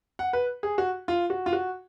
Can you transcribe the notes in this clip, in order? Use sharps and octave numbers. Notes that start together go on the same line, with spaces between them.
F#5
B4
G#4
F#4
F4
F#4
F4
F#4